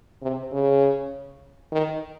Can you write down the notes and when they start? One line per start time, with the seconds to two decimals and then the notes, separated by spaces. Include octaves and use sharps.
0.22 C3
0.52 C#3
1.73 D#3